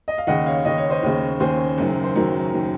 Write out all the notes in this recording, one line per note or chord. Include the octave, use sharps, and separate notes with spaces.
D#5
F5
D#2 C#3 D#5 F#5
C#5 F5
D#2 C#3 D#5
C#5
C5 D#5
D#2 C#3
D#2 C#3 G#4 C5
F#1 F#2 D#3
C5
F#1 F#2 D#3 F#4 A#4
D#3